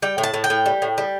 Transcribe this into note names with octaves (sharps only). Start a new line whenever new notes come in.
G3 G5
A2
A5
A2
G5
A2
G3
A2
G3